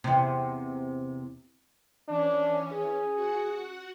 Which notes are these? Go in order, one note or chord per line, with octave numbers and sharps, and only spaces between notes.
E2 C3
E3 C#4 D4
G#4
F#4 F#5